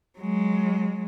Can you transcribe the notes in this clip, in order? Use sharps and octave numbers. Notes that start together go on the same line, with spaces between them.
F#3 G#3